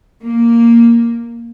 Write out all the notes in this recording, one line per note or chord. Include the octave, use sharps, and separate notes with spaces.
A#3